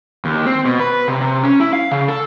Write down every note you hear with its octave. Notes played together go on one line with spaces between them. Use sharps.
D#2
C4
B2
B4
C3
C3
C#4
E4
F5
C#3
A4